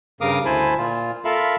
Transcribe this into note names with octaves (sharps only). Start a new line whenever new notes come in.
G2 C#3 A#4 F5 D6 D#6
D2 E4 C5 G#5 A5 B5
A#2 F4
F4 A4 A#4 E5 F5 B5